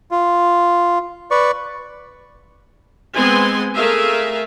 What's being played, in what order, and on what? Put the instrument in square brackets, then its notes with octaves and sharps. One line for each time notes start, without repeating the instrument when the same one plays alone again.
[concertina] F4
B4 D5 C#6
[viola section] G#3 B3 C4 G#5 C6
A3 G#4 A#4 E5 F5